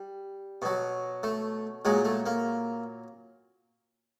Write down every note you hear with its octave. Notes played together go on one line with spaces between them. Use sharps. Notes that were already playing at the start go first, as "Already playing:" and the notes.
Already playing: G3
B2 F#3
A3
A#2 F#3 G#3
A3
A#3